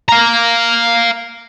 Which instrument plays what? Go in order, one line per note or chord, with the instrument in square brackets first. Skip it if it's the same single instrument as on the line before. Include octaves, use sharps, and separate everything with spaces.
[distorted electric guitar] F5 A#5